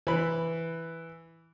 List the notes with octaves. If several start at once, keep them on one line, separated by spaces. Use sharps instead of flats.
E3 B5